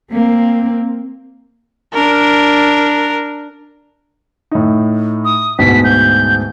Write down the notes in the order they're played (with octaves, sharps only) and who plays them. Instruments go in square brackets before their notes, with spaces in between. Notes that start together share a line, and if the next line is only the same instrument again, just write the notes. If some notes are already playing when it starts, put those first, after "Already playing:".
[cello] A#3 C4
[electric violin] D4 A#4
[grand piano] A2 D#4
[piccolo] D#6
[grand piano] D2 G#2 B2 [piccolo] B6
[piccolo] G6